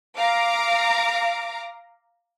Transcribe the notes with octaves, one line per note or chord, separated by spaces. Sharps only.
F5 A#5 D6